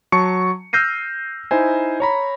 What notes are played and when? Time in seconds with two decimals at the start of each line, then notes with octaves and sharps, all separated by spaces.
0.12 F#3 A5 C#6 C#7
0.73 E6 F6 G6 A#6 C7 D#7
1.51 D#4 E4 C5 G#5
2.00 C#5 A#5 B5